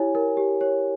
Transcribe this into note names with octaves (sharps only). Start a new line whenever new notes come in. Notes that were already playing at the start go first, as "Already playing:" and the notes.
Already playing: E4 G4 C#5 G#5
A#4
G4
C#5